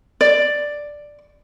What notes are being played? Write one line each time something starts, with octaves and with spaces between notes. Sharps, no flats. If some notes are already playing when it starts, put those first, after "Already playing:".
D5